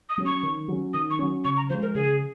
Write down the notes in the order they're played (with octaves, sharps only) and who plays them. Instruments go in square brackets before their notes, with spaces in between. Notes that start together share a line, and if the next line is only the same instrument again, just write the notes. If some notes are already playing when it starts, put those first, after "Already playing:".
[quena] D#6
[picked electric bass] F#3 C#4
[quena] C#6
[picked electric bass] D#3
F#3 C#4
[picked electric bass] D#3 [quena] D#6
[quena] C#6
[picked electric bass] F#3 C#4
[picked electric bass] C#3 [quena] C#6
[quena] A#5
[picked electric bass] F3 G#3 [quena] C5
[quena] A#4
[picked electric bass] C#3 [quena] G#4